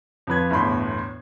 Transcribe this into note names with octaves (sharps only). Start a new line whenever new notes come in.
F2 F3 B4 G#6
G1 E2 A2 B5 C6